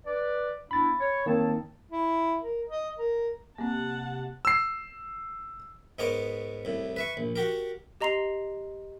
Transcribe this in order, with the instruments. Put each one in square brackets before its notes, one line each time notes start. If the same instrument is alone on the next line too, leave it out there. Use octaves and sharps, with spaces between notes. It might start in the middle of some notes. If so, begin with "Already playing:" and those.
[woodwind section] B4 D5
[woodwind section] B3 D4 E4 [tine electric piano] B5 A6
[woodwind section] C#5
[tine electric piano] D#3 A#3 [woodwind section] C4 C#5 A5
[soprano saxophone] E4
A#4
D#5
A#4
[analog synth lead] C3 [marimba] A#3 C4 [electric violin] F#5 A5
[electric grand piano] E6 C7
[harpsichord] G#2 G#3 B3 A#4 C#5 D6
C2 A2
B4 E5 C#6
A#1
F#4 G4 A#4
[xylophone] G4 D#5 A#5 C6 C7 F7